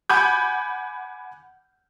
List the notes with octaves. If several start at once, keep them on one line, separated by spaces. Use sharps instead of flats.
F#5 G#5 B5 D6 G6